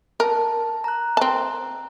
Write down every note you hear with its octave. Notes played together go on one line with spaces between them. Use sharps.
A#4 A5
A#5 F#6
C4 A5